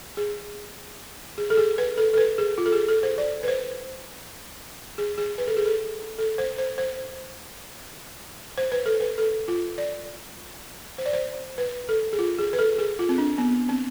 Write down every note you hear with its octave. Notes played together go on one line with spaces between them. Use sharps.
G#4
G#4
A4
G#4
B4
A4
A4
B4
G#4
F4
A4
G#4
A4
C5
D5
B4
C5
G#4
G#4
B4
A4
G#4
A4
A4
C5
C5
C5
C5
B4
A4
B4
A4
F4
D5
C5
D5
C5
B4
A4
G#4
F4
G#4
B4
A4
G#4
F4
C4
D4
B3
C4